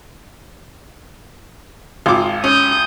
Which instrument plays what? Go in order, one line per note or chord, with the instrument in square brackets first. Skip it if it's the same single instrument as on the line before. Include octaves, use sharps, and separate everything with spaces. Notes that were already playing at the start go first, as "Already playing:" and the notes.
[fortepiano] G#1 D6 [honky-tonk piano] F4
[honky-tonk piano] C#4 [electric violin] D#6 G6